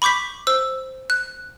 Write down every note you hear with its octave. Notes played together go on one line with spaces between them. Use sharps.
B5 C#6 D6 G6 B6
C5 E6
F#6